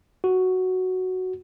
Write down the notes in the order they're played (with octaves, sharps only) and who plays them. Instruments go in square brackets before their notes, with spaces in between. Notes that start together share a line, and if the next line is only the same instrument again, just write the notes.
[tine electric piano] F#4